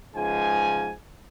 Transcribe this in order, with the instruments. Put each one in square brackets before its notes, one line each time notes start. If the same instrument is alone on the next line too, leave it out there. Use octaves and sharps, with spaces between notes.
[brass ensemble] C#2 G#2 F3 G#3 G#5